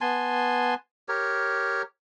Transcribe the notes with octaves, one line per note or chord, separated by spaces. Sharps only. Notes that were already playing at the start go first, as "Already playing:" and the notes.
B3 G#5 A5 C6
G4 A#4 C#5